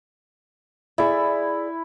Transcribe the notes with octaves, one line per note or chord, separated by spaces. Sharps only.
E4 G#4 D5